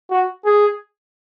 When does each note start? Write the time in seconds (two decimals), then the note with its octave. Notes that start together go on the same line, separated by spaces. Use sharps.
0.11 F#4
0.46 G#4